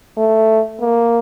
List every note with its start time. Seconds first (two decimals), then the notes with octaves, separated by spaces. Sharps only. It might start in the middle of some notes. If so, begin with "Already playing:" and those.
0.17 A3
0.80 A#3